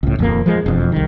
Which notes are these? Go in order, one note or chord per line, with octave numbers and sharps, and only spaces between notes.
C#2 A2
D#1 F2 G#3 A#3
F3 G#3
E1 F2
C2 D#3